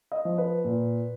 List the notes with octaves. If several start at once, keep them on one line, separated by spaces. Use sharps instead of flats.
D#5
F3
B4
A#2